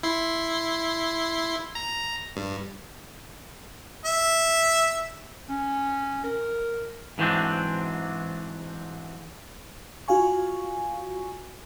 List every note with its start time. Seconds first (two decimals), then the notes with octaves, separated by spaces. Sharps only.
0.03 E4 C6
1.75 A#5
2.37 G2
4.05 E5
5.49 C#4
6.24 A#4
7.18 G#2 E3 F#3 C4 D4
10.08 F4 F#4 F5 G#5 C#6